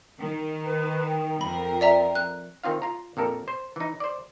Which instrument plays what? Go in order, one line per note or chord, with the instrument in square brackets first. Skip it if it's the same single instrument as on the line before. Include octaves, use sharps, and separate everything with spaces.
[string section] D#3
[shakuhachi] B4
G5
[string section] F2 A#4 [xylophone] B5
[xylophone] D5 E5 A#5
F#6
[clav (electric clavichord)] D#3 C4 F4 F5
F4 A#5
A#1 F2 A4 A#4
C5
E3 D#4
C5 D5